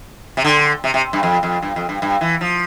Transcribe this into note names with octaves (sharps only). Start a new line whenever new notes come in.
C3
D3
C3
C3
G2
F2
F2
G2
F2
G2
G2
E3
F3